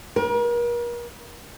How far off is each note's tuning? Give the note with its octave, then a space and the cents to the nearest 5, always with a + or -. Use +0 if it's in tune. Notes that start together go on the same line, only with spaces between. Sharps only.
A#4 +40